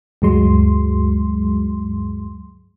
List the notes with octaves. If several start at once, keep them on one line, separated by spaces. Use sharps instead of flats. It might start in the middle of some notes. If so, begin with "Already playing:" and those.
D2 G2 F#3 G#3 C6